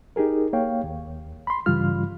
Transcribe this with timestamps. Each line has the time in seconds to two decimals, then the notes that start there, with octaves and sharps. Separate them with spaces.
0.16 D#4 G4 G#4 A#4
0.53 A#3 C#5 F5 G5
0.84 D#2
1.47 B5 C6
1.66 G2 C#3 E3 G3 F4 F6